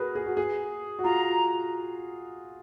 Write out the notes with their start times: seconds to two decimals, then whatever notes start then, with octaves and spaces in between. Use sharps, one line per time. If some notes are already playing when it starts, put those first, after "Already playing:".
Already playing: F#4 G#4 A#4 B4
0.15 G#4
0.26 F#4
0.37 G#4
0.99 F#4
1.04 F4 A#5